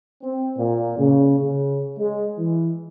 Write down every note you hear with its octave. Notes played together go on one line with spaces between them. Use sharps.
C4
A#2
C#3
C#3
G#3
E3